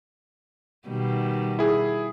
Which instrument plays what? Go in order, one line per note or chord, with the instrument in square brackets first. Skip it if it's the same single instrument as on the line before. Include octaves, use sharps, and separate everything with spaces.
[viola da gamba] B2 D#3 G3
[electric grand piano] E4 G#4